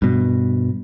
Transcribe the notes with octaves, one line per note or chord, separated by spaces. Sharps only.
G2 B2